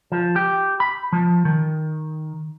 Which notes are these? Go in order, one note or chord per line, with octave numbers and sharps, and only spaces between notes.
F3
G4
B5
F3
D#3